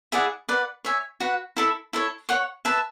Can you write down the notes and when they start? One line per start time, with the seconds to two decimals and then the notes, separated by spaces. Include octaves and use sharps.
0.12 E4 G#4 D5 F#5
0.49 B4 D5 F#5
0.85 C#5 E5 G#5
1.20 F#4 B4 F#5
1.57 E4 A4 E5 B5
1.93 E4 A4 C#5
2.29 C#5 F#5 C#6
2.65 B4 E5 A5